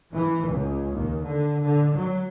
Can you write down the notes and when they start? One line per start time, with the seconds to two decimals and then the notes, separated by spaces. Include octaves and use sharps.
0.14 E3
0.47 C#2
0.94 D#2
1.25 D3
1.63 D3
1.97 F#3